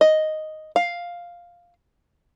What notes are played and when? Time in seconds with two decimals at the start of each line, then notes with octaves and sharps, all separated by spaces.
0.01 D#5
0.76 F5